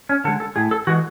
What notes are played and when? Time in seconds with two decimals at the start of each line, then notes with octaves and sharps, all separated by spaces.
0.09 C#4
0.24 D3 A4
0.28 G#3
0.40 A4
0.56 A2 G#4
0.71 A4
0.87 E3 G#3 F#4